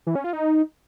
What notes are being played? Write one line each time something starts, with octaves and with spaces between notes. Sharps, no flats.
E3
C#4
F4
D#4